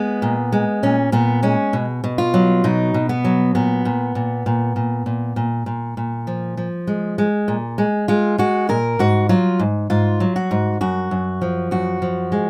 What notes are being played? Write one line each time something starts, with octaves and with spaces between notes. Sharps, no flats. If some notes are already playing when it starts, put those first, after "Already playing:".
Already playing: G#3 B3
A#2
G#3
A#2 C#4
A#2 B3
G#3 C#4
B2
B2
F4
F#3
B2 D#4
B2
B3
F#3
A#2 B3
A#2
A#2
A#2
A#2
A#2
A#2
A#2
A#2
F3
F3
G#3
G#3
A#2
G#3
G#3 F4
G#3 F#4
A#2 A#4
G#2 F#4
F#3 F4
G#2
G#2 F4
F#3
F#4
G#2
F#2 F#4
F#2
F3
F#2 F#4
F3
G#3